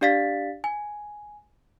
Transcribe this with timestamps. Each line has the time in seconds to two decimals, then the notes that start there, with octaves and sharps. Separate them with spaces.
0.01 D4 G4 D5 F5 A6 B6
0.64 G#5